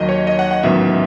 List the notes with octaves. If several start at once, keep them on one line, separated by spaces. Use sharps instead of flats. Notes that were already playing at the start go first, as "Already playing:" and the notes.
Already playing: D#2 D#3 F#3 D#5
C#5
D#5
F#5
F#5
A1 G#2 D#3 F#3 B3 E5